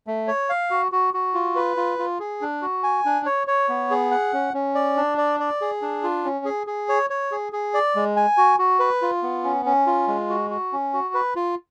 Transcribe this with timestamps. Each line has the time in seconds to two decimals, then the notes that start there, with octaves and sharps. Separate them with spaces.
0.07 A3
0.27 C#5
0.49 F5
0.71 F#4
0.92 F#4
1.14 F#4
1.34 F4
1.56 B4
1.77 F4
1.98 F4
2.20 G#4
2.41 D4
2.62 F#4
2.83 G#5
3.05 D4
3.26 C#5
3.47 C#5
3.69 B3
3.91 G#4
4.11 F#5
4.33 C#4
4.54 C#4
4.75 D5
4.97 D4
5.18 D5
5.40 D5
5.61 G#4
5.82 D4
6.03 F4
6.24 C#4
6.45 G#4
6.67 G#4
6.89 C#5
7.10 C#5
7.32 G#4
7.53 G#4
7.74 D5
7.96 G#3
8.16 G#5
8.38 F#4
8.59 F#4
8.80 B4
9.02 F4
9.23 B3
9.44 C#4
9.65 C#4
9.87 F4
10.08 G#3
10.29 F#4
10.50 F#4
10.72 C#4
10.93 F#4
11.14 B4
11.35 F4